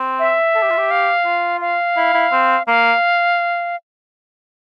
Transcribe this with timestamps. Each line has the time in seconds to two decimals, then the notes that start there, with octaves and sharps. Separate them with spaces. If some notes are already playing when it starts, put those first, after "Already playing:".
Already playing: C4
0.19 E5
0.55 A4
0.63 G4
0.70 F4
0.78 G4
0.91 F5
1.25 F4
1.61 F5
1.97 E4
2.14 E4
2.32 C4
2.67 A#3 F5